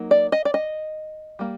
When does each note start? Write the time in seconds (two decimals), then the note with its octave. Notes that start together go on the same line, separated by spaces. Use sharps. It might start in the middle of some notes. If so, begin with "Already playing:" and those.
Already playing: F#3 A#3 D#4
0.11 D5
0.32 D#5
0.45 D5
0.54 D#5
1.39 G3 A#3